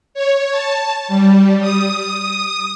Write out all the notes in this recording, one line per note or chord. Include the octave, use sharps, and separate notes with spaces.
C#5
A5
G3
D#6